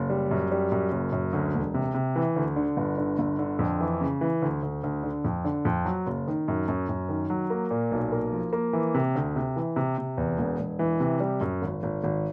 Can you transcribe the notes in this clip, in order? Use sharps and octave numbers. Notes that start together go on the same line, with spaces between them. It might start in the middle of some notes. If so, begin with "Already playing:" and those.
Already playing: F#1
G3
F#2
G3
F#2
F#1
F#2
D2
E1
C3
C3
E3
D2
D3
G1
D3
G1
D3
F2
E3
C#3
E3
D2
D2
D2
D3
F2
D3
F2
F#3
F#1
D#3
F#2
F#2
F#2
D#3
F#3
A#3
A#2
B1
A#3
F3
A#3
E3
C3
D2
C3
E3
C3
C3
E2
E1
E1
E3
C3
G3
F#2
G#1
G#1
G#1